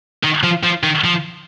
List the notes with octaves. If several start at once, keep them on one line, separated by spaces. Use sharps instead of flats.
D#3
F3
F3
D#3
F3